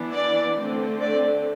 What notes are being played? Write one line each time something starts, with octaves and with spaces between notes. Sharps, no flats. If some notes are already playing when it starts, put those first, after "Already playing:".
Already playing: E3 B3 D4
D5
D3 A3 C4
D5